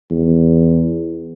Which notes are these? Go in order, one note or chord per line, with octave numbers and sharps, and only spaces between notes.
E2